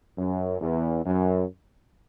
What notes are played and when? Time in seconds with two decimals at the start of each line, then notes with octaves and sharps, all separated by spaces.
0.18 F#2
0.61 E2
1.05 F#2